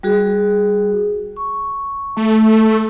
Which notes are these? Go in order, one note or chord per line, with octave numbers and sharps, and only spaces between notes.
G3 F#4 G#4
C#6
A3